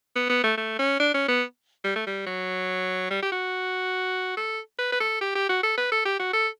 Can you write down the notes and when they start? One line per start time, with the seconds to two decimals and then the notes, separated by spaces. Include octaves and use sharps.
0.16 B3
0.30 B3
0.44 A3
0.58 A3
0.79 C#4
1.00 D4
1.14 C#4
1.28 B3
1.84 G3
1.96 A3
2.07 G3
2.26 F#3
3.11 G3
3.22 G4
3.32 F#4
4.37 A4
4.79 B4
4.92 B4
5.00 A4
5.21 G4
5.35 G4
5.49 F#4
5.63 A4
5.78 B4
5.92 A4
6.06 G4
6.19 F#4
6.33 A4